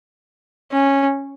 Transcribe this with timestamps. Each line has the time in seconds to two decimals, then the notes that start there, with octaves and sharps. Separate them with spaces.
0.72 C#4